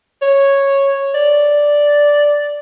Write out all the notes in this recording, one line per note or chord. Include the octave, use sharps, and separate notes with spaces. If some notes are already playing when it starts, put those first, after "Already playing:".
C#5
D5